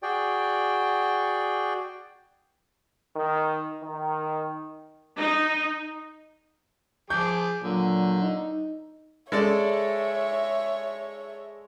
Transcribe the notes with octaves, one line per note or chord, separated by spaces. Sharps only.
F#4 G#4 D5 G5
D#3
D#3
D#4
F3 G#4 D6 G6
A#2 D3 F#3
D#4
G#3 A4 C#5 D5 E5